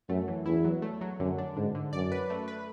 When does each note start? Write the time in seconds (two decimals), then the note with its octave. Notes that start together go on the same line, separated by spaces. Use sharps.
0.09 F#2 A3
0.28 E3
0.46 E2 E4
0.65 F#3
0.82 A3
1.01 F#3
1.20 F#2 D3
1.38 D4
1.57 G#2 D3
1.75 D3
1.93 F#2 D5
2.12 B4
2.30 A3
2.48 B4